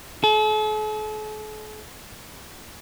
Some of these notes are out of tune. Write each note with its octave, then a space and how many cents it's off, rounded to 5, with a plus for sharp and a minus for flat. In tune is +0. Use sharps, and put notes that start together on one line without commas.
A4 -45